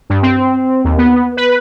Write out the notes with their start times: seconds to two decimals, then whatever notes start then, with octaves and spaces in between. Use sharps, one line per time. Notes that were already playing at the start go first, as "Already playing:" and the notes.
0.10 G2
0.23 C4
0.84 D#2
0.98 B3
1.37 B4